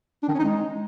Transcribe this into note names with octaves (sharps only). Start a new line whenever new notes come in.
D4
D#3
C#4
D#4
G#3